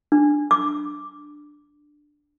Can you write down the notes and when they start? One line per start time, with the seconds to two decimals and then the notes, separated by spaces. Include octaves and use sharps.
0.12 D4
0.51 D6